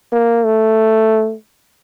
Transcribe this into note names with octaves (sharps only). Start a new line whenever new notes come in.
A#3
A3